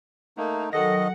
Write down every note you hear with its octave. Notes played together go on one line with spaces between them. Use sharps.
A3 A#3 D#4
D#3 F#3 A4 D#5 F#5 A#6